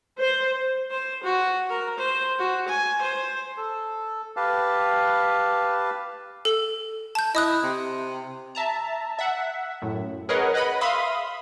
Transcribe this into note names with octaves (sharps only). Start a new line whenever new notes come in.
C5
C5
F#4
A#4
C5
F#4
G#5
C5
A4
G4 B4 F5 A5
A4
A5 G6
E4 D#5 D#6 F#6
C3
E5 A5 A#5
E5 F#5
F#2 A2
G#4 A#4 B4 C#5 D#5 F#5
B4 D#5 F#5 B5
E5 F5 B5 C6 D#6